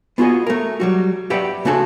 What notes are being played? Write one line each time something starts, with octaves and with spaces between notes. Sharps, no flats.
B3 F4 F#4 G#4 D#5
A3 A#4
F#3 G3 F#4
G4 B4 D5 E5 F#5 G5
C#3 A3 D4 F#4 G#4 A4